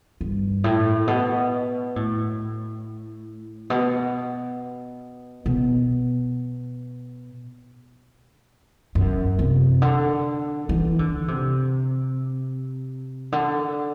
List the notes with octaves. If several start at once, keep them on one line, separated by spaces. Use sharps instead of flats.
G2
A2
B2
A2
B2
B2
F#2
C3
D3
E3
D3
C3
D3